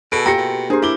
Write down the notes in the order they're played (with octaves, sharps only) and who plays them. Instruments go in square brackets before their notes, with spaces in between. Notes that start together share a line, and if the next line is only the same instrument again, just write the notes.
[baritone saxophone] B2 [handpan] G#4 A4 [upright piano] D7
[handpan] A#3 F4 [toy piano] G4 A#5 [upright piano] G5 A#6 C#7
[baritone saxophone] B2
[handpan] A#3 A#4 C5 [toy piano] D4 G4 [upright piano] G#4
[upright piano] E4 D6 G7